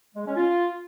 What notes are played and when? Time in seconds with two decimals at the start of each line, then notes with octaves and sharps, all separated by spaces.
0.15 G#3
0.26 C#4
0.36 F4